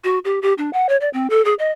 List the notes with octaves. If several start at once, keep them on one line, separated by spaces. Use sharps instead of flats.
F#4
G4
G4
D4
F#5
C#5
D5
C4
A4
G#4
D#5